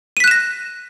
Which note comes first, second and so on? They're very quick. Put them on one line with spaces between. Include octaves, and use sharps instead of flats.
D#7 B6 F#6 E7 A#6